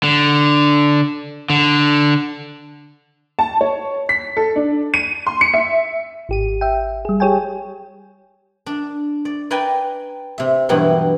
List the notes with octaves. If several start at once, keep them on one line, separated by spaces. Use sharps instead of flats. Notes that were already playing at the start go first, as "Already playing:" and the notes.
D3
D3
A5
C#5
B6
A4
D4
D#7
C6
C#7
E5
G#1 G4 D#7
E5 G5
G3 G#4
G4 G#4 C#5 G5 G#5
D4
D5
B4 D5 G5 G#5 A#5
C3 E5
G2 B2 E3 F#3 G4